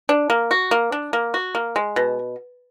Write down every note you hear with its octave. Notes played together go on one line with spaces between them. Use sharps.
D4
A#3
F#4
A#3
D4
A#3
F#4
A#3
G#3
B2